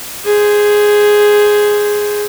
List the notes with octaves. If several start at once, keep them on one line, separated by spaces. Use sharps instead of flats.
G#4 C5